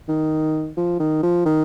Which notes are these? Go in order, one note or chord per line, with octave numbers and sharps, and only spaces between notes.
D#3
F3
D#3
F3
D#3